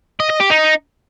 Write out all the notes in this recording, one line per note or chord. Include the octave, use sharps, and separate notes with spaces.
D#5
D#5
G4
D#4